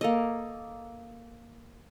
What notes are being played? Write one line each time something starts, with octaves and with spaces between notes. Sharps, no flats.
A#3 A4 D#5